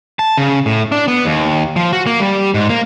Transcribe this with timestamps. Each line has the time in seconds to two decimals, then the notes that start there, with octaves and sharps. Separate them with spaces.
0.19 A5
0.38 C#3
0.66 A2
0.92 D4
1.08 B3
1.25 D#2
1.76 F3
1.93 F#4
2.07 A#3
2.20 G3
2.54 G#2
2.69 A#3